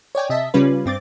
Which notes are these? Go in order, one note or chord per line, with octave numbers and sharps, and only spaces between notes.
C#5 D5 G5 G#5
C3 D#5 E5 A5 B6
C#3 G3 C#4 F4 B4
G2 C4 D6 A6